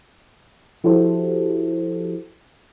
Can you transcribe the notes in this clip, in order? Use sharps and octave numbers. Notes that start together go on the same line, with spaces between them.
F3 E4 F#4 G4 A4 C5